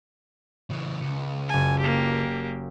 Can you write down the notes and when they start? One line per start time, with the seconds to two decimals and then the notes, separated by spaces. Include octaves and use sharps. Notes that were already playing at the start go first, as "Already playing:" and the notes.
0.70 C#3 E3
1.01 C#2 C#7
1.49 F#1 G#5 A5
1.80 A#3 G4